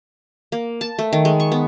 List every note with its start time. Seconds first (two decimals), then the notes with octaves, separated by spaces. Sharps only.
0.52 A#3
0.81 A5
0.99 A3
1.13 D#3
1.25 G#3
1.40 C#6
1.52 B3